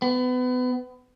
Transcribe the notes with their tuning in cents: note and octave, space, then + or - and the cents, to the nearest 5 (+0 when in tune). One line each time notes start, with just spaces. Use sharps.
B3 +30